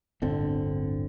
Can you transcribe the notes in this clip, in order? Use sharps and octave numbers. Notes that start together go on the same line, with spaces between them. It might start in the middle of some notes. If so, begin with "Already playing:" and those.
D1 G1 D3 C4